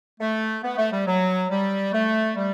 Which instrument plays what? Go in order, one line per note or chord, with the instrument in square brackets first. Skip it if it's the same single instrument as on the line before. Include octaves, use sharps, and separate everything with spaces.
[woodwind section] A3
B3
A3
G3
F#3
G3
A3
G3